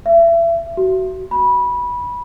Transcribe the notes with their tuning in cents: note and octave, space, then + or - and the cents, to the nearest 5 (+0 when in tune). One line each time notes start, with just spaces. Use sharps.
E5 +35
F#4 +25
B5 -20